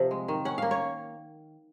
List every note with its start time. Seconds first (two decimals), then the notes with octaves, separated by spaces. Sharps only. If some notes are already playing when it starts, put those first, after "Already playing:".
Already playing: C3 F3 C4
0.11 G#3
0.28 D#3
0.45 C#4 F#5
0.58 A#3 F5
0.71 C#5